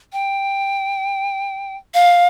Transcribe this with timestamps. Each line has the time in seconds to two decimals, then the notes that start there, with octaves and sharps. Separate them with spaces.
0.13 G5
1.94 F5